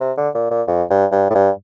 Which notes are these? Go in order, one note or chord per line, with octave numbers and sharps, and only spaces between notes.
C3
D3
A#2
A#2
F2
G2
G2
A2
G2